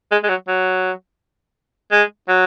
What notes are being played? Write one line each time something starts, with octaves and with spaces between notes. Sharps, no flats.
G#3
G#3
F#3
F#3
G#3
F#3